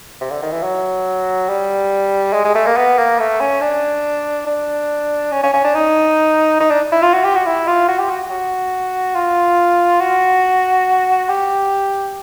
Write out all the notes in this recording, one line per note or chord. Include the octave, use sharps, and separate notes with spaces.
C3
D3
D#3
E3
F#3
G3
G#3
G#3
A3
A#3
B3
A#3
A3
C#4
D4
D4
C#4
C#4
C#4
D4
D#4
D#4
D4
E4
F4
F#4
G4
F#4
E4
F4
F#4
G4
F#4
F#4
F4
F#4
G4